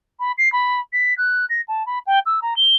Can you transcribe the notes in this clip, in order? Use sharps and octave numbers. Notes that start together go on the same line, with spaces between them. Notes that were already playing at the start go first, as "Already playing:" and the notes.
B5
C7
B5
B6
F#6
A#6
A5
B5
G5
E6
A#5
G7